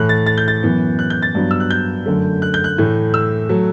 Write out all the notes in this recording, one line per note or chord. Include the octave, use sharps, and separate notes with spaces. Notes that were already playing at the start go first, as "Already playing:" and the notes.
Already playing: A2 E3 A3 F#6
A6
A6
G6
A6
F#2 E3 B3
F#6
G6
A6
G2 F#3 B3
E6
F#6
G6
F#2 D3 A3
F#6
G6
F#6
A2 E3 A3
E6
F#3 A3